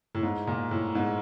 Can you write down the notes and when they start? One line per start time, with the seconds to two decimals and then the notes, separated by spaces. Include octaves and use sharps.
0.15 A2
0.23 G#2
0.47 A#2
0.71 A2
0.95 G#2